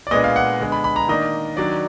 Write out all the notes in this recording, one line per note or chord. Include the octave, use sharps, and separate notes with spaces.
D5
A#2 G#3 B3 D4 D#5
F5
F#5
D3 G#3 B3
B5
B5
A#5
D#3 A#3 D4 D#5
D#3 F#3 D4 D5